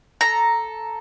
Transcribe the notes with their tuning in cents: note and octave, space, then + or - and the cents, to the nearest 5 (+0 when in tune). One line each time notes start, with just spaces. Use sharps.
A4 +0 A#5 +0